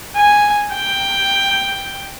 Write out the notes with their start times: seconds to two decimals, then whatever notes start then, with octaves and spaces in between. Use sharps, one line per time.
0.17 G#5
0.73 G5